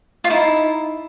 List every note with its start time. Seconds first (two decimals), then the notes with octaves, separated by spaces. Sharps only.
0.24 F4
0.30 D#4 E4